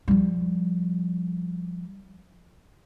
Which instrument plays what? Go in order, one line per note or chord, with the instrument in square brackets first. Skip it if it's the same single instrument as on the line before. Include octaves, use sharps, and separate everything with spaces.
[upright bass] F3 G3